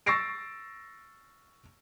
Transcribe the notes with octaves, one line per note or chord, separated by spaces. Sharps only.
C#6 E6 A6 A#6 C7 D7